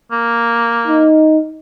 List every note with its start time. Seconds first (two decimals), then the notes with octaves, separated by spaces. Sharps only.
0.12 A#3
0.87 D#4